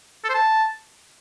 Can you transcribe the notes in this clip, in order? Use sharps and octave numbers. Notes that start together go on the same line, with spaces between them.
A4
C5
A5